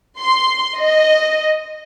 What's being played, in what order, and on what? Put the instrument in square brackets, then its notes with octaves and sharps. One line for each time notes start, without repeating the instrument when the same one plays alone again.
[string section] C6
D#5